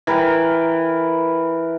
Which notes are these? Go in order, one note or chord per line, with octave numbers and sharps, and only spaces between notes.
E3 A#4 B4 G5